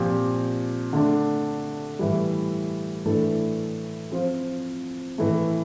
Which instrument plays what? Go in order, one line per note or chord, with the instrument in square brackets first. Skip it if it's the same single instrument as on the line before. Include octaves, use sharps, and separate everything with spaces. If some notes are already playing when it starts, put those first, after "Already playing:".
Already playing: [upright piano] A#2 F3 C4 G4
D3 A3 D4
A2 E3 G3
A2 E3 A3 D4 A4
F3 C4 F4 C5
A2 E3 A3